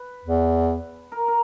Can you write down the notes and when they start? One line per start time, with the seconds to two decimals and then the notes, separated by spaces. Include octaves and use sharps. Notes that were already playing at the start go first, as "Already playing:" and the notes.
Already playing: B4
0.25 E2
1.12 A#4
1.28 A#4